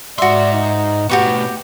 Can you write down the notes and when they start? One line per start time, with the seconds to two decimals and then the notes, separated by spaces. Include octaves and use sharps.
0.18 G#2 F#4 D5 E5 C6
0.53 D#4
1.09 B2 A3 B3 F#4 G4 C#6